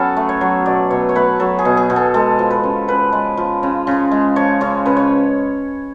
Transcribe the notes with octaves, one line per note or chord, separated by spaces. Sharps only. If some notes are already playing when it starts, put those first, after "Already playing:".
Already playing: F#3 B3 C#4 A4
A3
C#5
F#3
B2 D5
B2 C#5
C#5
A3 B4
F#3 A4
G#4
B2
G#4
B2
A4
G#3 A4
F3
B4
C#3
C#3 B4
G#3
F3
C#3
C#3
G#3
F3 C#5
C#3 C#5
C#3 B4
C#5